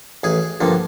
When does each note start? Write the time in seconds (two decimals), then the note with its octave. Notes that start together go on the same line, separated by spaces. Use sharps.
0.24 A1 G#4
0.60 G2 D3 F3 A#3